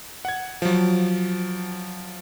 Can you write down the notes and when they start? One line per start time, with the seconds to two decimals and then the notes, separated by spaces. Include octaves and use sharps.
0.25 F#5 G#6
0.62 F3 F#3